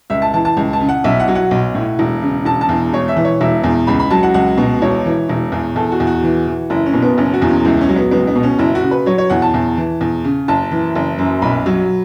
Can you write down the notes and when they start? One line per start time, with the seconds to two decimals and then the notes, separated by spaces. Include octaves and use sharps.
0.10 C#2 E5
0.22 A5
0.34 E3 A5
0.45 A5
0.57 C#2
0.73 A5
0.80 C#3
0.89 F#5
1.04 B1 E5
1.20 F#5
1.28 F#3
1.35 F#5
1.51 B1
1.74 A2
1.99 E1
2.22 C#3
2.45 E1 A5
2.61 A5
2.69 E2
2.93 E1 C#5
3.08 E5
3.17 E3
3.25 C#5
3.40 E1 E5
3.64 E2
3.87 C#2 B5
4.00 B5
4.11 F#3 A5
4.23 F#5
4.34 C#2 F#5
4.58 B2
4.82 E1 C#5
5.06 E3
5.29 E1
5.52 E2
5.76 E2 A4
5.86 A4
5.92 F#4
6.00 E2
6.07 F#4
6.23 E3
6.47 E3
6.70 F#1 E4
6.86 C#4
6.94 B2
7.02 B3
7.18 F#1 C#4
7.34 F#4
7.42 E2
7.49 C#4
7.65 C#2 E4
7.81 C#4
7.89 F#3
7.96 B3
8.11 C#2 B3
8.27 B3
8.36 B2
8.43 C#4
8.59 F#1 E4
8.75 F#4
8.83 C#3
8.91 B4
9.06 F#3 C#5
9.18 C#5
9.30 E2 F#5
9.42 A5
9.54 E2
9.77 E3
10.01 E2
10.24 C#3
10.48 F#1 A5
10.71 E3
10.95 F#1
11.18 F#2
11.42 B1 B5
11.66 F#3